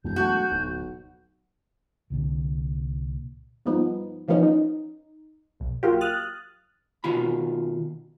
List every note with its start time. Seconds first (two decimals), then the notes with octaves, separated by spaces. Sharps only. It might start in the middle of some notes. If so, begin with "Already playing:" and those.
0.04 E1 F#2 G6
0.16 F#3 A3 F#4
0.50 D1 B1
2.10 C2 A#2 D3
3.65 G2 F3 B3 D#4
4.28 E3 F3 A#3 B3 C#4 D#4
4.43 D#4
5.60 B1
5.83 F#3 A#3 F4 G4
6.01 D#6 F6 F#6 A6
7.04 B2 D#3 F4 B5